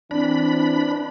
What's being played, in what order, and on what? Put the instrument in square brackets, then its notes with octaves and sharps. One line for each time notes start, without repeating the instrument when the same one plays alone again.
[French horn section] E3 C4 [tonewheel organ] D4 B5